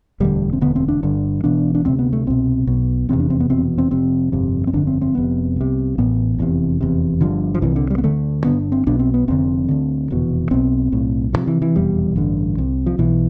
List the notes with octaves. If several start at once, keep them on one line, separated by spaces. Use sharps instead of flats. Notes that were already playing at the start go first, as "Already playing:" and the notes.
E1 D2 D3 G3
C4
E1 D2 D3 B3
C4
D4
G1 G2 D3
E1 E2 B2 D4
D4
D2 C3 C4
B3
A3
C2 B2 C4
B1 B2
F1 E2 C3 C4
D4
C4
B3
F1 E2 B2 C4
C4
F1 F2 C3 C4
G1 F2 C3
C4
G1 F2 D3 D4
C4
C4
F1 F2 C3 B3
C2 C3
A1 A2 B3
F1 E2 C3
F1 E2 C3
G1 G2 D3 F3
F3
C2 C3 E3
D3
G3
B3
D2 D3 A3
G1 F2 D3 B3
C4
B1 B2 D4
C4
B3
F1 F2 D3 C4
D2 D3
F1 E2 B2
B1 B2 C4
B1 A2
D2 C3 F3
E3
E3
F1 E2 B2 G3
A1 G2 D3
C2 C3
F3
B1 B2 E3